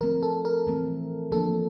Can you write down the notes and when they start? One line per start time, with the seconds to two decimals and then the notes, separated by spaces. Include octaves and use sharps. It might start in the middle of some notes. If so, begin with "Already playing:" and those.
0.01 F3 A3 C4 A#4
0.23 A4
0.45 A#4
0.67 E3 A3 C4
1.32 F3 A#3 D4 A4